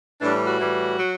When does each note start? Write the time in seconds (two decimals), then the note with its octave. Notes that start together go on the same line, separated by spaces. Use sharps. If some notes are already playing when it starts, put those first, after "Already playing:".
0.21 A2 E3 G3 D4
0.47 F#4
0.59 A2 E3 G3
0.99 F#3